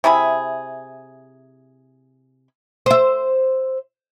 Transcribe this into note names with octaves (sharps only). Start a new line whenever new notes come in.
C3 E4 G#4 B5
C5 E5